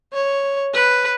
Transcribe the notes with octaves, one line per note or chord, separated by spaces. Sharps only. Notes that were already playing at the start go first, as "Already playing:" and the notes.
C#5
B4